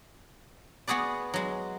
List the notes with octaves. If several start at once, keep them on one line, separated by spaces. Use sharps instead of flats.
B3 F#4 G#4 B4 D5
F#3 G#3